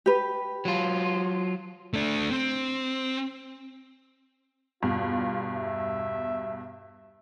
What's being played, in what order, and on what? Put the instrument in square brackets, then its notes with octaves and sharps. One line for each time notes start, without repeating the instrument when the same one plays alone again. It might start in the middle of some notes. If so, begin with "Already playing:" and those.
[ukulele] G4 B4
[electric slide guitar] F#3 F4
[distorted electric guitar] A3 D4
C4
[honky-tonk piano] E2 G2 B2 [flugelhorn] F4
[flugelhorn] E5